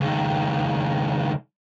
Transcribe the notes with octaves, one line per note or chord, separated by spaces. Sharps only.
C#2 D#3